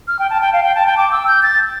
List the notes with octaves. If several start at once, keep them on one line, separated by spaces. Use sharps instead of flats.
F6
G5
A5
G5
F5
G5
A5
G5
D6
E6
G6
A6